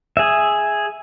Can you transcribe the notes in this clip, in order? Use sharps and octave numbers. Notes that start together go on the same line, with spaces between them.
G#4 E5